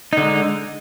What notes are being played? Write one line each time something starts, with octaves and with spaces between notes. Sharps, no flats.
D3 G#3 D#4